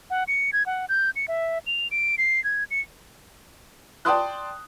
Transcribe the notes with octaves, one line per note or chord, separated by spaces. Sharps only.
F#5
C#7
G#6
F#5
G6
C#7
E5
F7
D7
C7
G#6
C#7
D5 G5 A5 C6 D#6 F#6